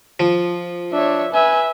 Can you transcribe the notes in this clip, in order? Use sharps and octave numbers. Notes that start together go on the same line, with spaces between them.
F3
D4 C#5 E5
B4 E5 G#5